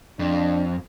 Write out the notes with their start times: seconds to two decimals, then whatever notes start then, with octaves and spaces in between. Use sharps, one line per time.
0.19 F2 D4